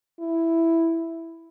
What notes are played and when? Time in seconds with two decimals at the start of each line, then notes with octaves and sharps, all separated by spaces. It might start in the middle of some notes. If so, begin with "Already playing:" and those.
0.20 E4